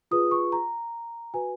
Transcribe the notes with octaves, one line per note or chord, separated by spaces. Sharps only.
F4 G#4 B4 D#6
C#6
A#5
F#4 B4 G#5